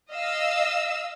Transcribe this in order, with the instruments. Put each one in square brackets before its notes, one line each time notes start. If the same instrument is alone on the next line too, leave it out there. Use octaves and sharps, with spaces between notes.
[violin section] D#5 F5 E6